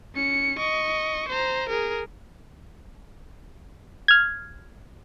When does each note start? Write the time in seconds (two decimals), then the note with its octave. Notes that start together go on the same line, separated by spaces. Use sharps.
0.15 C#4 C#7
0.59 D#5 C#6
1.29 C5 A#5
1.69 G#4 A#4
4.08 F6 G#6